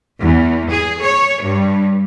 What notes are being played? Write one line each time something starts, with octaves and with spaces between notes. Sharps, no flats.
E2
G#4
C#5
G2